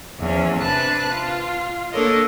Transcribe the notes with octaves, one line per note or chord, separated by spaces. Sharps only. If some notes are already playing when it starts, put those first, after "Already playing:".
E2 F3 C#4
C3 D4 B4 A5 B5 F#6
F4
A#3 D4 A4 A#4 C#5 D#5